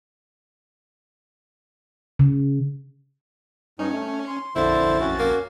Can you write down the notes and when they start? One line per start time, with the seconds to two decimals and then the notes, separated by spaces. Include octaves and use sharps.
2.19 C#3
3.79 G2 C#4 D#4
3.92 A3
4.27 C6
4.56 A#1 F2 D3 E4 C5 A6
5.00 C#4 F#4
5.19 A#3